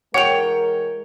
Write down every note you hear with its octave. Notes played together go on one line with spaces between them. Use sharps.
E3 G#3 A#4 C#5 F#5 G5 F7